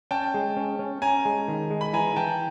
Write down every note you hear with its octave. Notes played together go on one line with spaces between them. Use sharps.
C#4 G5 A5
G#3
C#4
C#4
C#4 G#5 A#5
G#3
D#3
G#3
B5
E3 G#5 A#5
E3 G5 A5